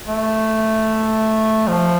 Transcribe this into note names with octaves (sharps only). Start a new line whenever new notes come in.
A3
F3